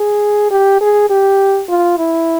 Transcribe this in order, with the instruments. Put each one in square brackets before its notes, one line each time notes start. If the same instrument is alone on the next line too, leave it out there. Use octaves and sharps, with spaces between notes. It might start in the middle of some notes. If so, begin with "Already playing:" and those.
Already playing: [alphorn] G#4
G4
G#4
G4
F4
E4